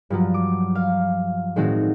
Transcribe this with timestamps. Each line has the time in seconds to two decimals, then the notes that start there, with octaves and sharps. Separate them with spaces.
0.10 G2 F3 F#3
0.34 D6
0.75 F5
1.56 A2 D#3 G#3 A3 C4 F#4